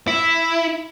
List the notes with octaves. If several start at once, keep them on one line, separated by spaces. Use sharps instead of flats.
E4